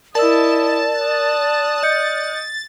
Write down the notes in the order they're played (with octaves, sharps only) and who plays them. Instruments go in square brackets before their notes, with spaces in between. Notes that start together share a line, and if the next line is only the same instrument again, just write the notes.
[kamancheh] E4 D#5 [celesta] A#4 E6 [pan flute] D5 [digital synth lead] A5
[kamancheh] D#6 F#6
[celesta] D#5 G6 C#7 [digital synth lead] A6